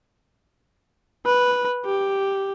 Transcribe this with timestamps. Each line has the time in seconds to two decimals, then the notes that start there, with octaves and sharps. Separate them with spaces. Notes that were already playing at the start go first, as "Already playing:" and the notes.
1.26 B4
1.85 G4